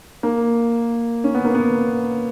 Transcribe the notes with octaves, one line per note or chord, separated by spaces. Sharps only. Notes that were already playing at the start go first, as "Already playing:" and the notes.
A#3
C#4
B3
A#3
B3